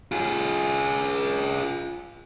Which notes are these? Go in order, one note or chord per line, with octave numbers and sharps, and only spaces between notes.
F4 G#4